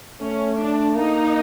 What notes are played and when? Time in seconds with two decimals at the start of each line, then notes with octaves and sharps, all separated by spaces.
0.21 A3 C#4
0.59 D4
0.95 A#3 D#4